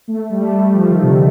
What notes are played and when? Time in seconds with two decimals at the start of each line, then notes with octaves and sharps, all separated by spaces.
0.08 A3
0.30 G3
0.41 A3
0.52 G3
0.65 G3
0.74 F3
0.90 D#3
1.03 C3
1.07 D3